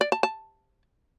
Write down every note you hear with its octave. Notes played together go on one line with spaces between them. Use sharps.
D5
A5
A5